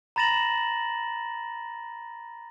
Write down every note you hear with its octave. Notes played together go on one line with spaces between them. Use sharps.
A#5 B5 A6 A#6 E7 F#7